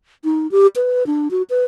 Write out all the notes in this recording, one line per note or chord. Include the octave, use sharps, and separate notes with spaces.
D#4
G4
B4
D4
F#4
B4